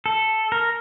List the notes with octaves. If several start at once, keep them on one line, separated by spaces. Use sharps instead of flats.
A4
A#4